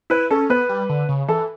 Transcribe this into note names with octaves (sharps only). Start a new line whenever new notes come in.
E4 B4
C#4 A4
B3 B4
G3
D3
C#3
E3 A4